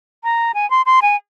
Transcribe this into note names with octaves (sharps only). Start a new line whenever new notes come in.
A#5
G#5
C6
C6
G#5